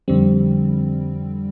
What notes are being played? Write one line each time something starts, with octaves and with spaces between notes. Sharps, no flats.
F2 D3 G3 C4